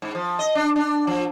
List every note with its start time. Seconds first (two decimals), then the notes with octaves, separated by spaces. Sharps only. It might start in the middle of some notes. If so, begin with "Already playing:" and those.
0.02 G#2
0.15 F3
0.39 D#5
0.55 D4
0.76 D4
1.07 F3